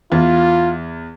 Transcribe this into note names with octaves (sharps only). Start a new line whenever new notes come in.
E2 F4